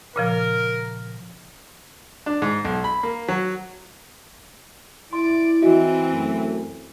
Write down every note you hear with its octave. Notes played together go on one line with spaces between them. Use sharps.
A#2 C#3 F3 A#4
D4
G#2
B1
B5
A#3
F#3
E4 D5 C6
E3 C4 F#4 D#5 E5
F#2 A3